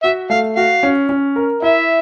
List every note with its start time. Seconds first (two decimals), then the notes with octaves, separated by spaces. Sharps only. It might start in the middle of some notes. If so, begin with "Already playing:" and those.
0.03 F#4 E5
0.30 A3 F5
0.56 F#4 F5
0.83 C#4
1.09 C#4
1.36 A#4
1.62 E4 E5